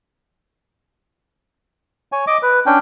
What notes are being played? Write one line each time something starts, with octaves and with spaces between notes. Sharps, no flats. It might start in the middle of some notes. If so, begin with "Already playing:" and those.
C#5 G#5
D#5 D6
B4
C#4 D4 G5